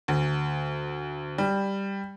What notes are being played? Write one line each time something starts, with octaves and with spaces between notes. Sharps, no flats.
D2
G3